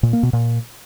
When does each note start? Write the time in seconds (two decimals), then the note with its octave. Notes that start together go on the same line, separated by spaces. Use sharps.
0.03 A#2
0.13 A#3
0.23 B2
0.33 A#2